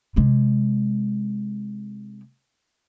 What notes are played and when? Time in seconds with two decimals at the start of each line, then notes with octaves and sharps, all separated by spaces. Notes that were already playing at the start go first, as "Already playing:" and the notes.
0.16 C3 G#3